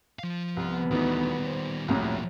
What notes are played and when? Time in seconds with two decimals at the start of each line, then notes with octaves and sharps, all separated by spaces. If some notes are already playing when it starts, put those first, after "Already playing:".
0.19 F3 F5
0.57 C2 B3
0.91 D2 D#3 E3 G3 D#4
1.46 C5
1.88 C2 F#2 A2 F3 A#3